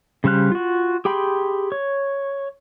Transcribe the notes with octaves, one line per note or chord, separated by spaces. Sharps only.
C#3 G3 C5 F5 F#6
F4 F#4
G4 G#4 G5 B5 C6
C#5